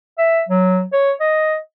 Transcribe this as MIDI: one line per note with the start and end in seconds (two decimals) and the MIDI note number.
0.18 0.42 76
0.49 0.84 54
0.93 1.12 73
1.21 1.58 75